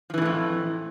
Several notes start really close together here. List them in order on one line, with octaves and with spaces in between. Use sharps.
F3 E3 C#3 A2 F2